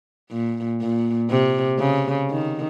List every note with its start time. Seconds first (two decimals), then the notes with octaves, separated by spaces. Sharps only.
0.31 A#2
0.81 A#2
1.30 C3
1.79 C#3
2.30 D#3